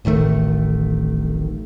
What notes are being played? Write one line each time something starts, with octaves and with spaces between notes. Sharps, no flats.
D1 A1 D#3 A3